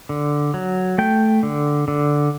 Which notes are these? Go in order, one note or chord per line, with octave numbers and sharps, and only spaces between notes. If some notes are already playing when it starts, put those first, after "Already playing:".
D3
F#3
A3 G5
D3
D3